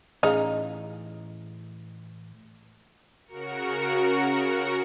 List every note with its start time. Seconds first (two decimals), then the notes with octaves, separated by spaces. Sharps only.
0.23 A2 E3 C#4 D#4 G#4 F5
3.26 C#3 F#4 A#4 C#7